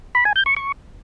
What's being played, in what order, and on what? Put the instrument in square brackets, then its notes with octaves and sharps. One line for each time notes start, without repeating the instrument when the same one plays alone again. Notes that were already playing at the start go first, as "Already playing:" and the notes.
[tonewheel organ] B5
G#5
G6
C#6
C#6